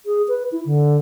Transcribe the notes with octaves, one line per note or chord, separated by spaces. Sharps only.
G#4
B4
E4
D3